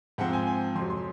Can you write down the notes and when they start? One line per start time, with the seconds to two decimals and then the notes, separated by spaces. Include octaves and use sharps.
0.18 G#2 F3 C4 F#5
0.33 G#5
0.47 G#5
0.75 F2 C3 F#3 C6
0.90 C6